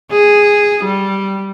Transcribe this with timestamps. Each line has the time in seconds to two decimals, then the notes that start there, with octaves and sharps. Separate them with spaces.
0.12 G#4
0.84 G3